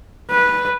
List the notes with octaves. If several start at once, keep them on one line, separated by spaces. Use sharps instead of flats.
B4